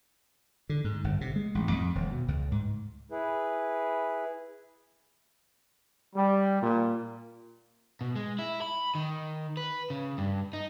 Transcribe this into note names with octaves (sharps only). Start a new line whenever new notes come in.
D3
G#2
G1
C3
G#3
A1
F2
D#1
B2
C#2
G#2
E4 G#4 B4
G3
A#2
B2
G#3
E4
B5
D#3
B4
C#3
G2
D#4